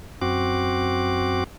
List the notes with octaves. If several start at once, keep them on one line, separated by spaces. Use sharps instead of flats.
F#2 C4 F#4 D6